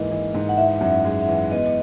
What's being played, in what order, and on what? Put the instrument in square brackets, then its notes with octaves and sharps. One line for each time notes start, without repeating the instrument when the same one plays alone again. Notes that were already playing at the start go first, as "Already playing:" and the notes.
Already playing: [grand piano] G#2 E3 A#3 [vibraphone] D#5
[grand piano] E3
G#2
[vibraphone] F#5
[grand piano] E3 [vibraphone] E5
[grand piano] F#2
G#3
E3
[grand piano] B3 [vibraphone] D#5